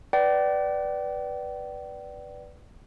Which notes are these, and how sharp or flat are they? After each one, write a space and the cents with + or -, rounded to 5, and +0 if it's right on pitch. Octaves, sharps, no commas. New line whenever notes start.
B4 +0 D5 +0 G5 -40